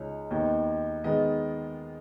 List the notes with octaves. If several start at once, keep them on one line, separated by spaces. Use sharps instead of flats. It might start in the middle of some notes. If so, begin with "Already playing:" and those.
Already playing: C#2 C#3 G#3 D#4 C#5
D#2 D#3 B3 D#4 D#5
D#3 G#3 B3 D#5